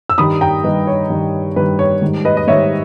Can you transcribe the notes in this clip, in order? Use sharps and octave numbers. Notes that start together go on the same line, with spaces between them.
E6
G2 D#3 G3 B5 D#6
G5 A#5
G2 D#3 G3 B4 D#5
C#5
G2 D#3 G3
G2 D#3 G3 B4
C#5
G#2 D#3 G3
B4 D#5
D#5
G#2 D#3 G3 C#5 E5